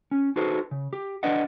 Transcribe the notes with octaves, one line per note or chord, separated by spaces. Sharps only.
C#4
D#4 F#4 G#4 A4 B4 C5
C#3
G4
D4 B4 D5 D#5 F#5